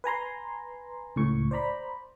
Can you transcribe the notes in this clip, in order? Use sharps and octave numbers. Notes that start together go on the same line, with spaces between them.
B4 G#5 A#5 C6
C#2 A2 C#6
C5 D5 A#5 B5